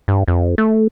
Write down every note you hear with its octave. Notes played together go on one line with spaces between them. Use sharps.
G2
F2
A3